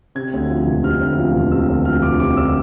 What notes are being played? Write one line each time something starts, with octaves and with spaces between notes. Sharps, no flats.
C3 G#6
D2
F3
E1
C3 F6
D2
F3
E1
C3 E6
D2
F3 F6
E1 D6
C3 D6
D2 E6